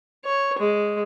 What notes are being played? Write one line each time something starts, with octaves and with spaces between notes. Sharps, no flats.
C#5
G#3